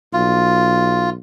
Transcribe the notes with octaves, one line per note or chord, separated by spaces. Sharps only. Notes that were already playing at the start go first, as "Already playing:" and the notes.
B1 F4